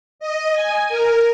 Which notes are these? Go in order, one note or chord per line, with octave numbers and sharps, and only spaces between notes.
D#5
G#5
A#4